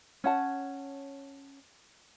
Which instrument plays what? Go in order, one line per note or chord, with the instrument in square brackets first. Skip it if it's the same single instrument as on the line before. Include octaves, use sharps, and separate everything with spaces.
[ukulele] C#4 C#5 F#5 A5